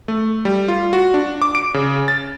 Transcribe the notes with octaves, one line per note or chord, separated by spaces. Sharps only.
A3
G3
F4
F#4
D4
D6
D7
C#3
A6